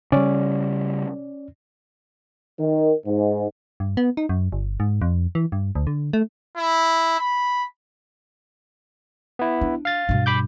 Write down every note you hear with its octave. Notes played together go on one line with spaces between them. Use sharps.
C#3 G3 C#4 D5
D#3
G#2
G2
B3
D#4
F#2
G1
G#2
F2
E3
G2
D2
D3
A3
E4
B5
B3 E4
D4
F5 A6
G2 B2
B5 D6 G6